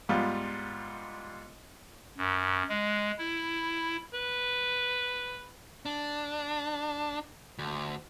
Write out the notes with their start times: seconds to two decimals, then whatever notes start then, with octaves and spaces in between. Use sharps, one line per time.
0.09 G#2 G3 B3 F4
2.17 F#2
2.69 G#3
3.19 E4
4.14 B4
5.85 D4
7.58 D2